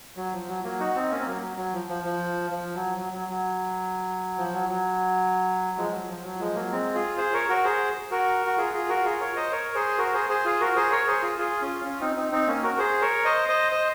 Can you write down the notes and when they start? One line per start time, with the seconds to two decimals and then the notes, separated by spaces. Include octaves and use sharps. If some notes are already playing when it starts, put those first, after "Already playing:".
0.17 F#3
0.33 F3
0.48 F#3
0.64 F#3 A#3
0.80 D#4 F#4
0.95 C4 D#4
1.11 A#3 C#4
1.20 C4
1.26 F#3 A#3
1.42 F#3
1.57 F#3
1.73 F3
1.88 F3
2.04 F3
2.51 F3
2.74 F#3
2.98 F#3
3.13 F#3
3.29 F#3
4.38 F3
4.53 F#3
4.69 F#3
5.78 F3 G#3
5.93 F#3
6.09 F3
6.24 F#3
6.40 F3 G#3
6.55 F#3 A#3
6.71 G#3 C4
6.95 F4 G#4
7.18 G#4 C5
7.33 A#4 C#5
7.49 F#4 A#4
7.65 G#4 C5
8.11 F#4 A#4
8.46 F#4
8.57 F4 G#4
8.73 F4 G#4
8.89 F#4 A#4
9.05 F4 G#4
9.20 A#4 C#5
9.36 C5 D#5
9.51 A#4 C#5
9.75 G#4 C5
9.98 F#4 A#4
10.14 G#4 C5
10.29 G#4 C5
10.45 F4 G#4
10.60 F#4 A#4
10.76 G#4 C5
10.91 A#4 C#5
11.07 G#4 C5
11.22 F4 G#4
11.38 F4 G#4
11.62 C#4 F4
11.85 C#4 F4
12.00 C4 D#4
12.16 C4 D#4
12.32 C4 D#4
12.47 A#3 C#4
12.63 F#4 A#4
12.78 G#4 C5
13.01 A#4 C#5
13.25 C5 D#5
13.48 C5 D#5
13.72 C5 D#5